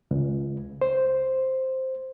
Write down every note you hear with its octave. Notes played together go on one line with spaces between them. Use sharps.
C#2
C5